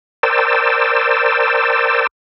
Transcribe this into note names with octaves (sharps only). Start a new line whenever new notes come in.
A#4 C5 D5 G5 A5 E6